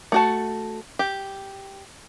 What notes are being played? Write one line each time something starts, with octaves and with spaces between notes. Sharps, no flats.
A3 F#4 A5
G4